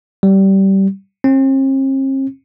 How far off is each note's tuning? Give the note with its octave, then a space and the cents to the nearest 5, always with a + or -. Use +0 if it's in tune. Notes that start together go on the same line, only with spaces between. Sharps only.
G3 -20
C4 +45